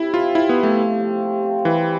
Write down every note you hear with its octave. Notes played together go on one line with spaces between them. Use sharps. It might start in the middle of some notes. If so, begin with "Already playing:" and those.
Already playing: C3 E4
F3 C4 F4
C3 E4
B3
F3 C4
A3
C3
F3 C4
C3
F3 C4
E3 G3